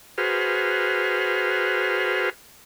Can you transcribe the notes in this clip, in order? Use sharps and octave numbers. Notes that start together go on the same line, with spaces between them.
F#4 G#4 B4 C5 F6